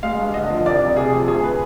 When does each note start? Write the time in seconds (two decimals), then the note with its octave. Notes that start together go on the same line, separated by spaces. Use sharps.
0.03 G#3 F5
0.20 G2
0.34 D3 D#5
0.50 F3
0.65 C2 D5
0.81 C2
0.97 C3 G#4
1.12 F3
1.27 D2 G#4
1.44 B4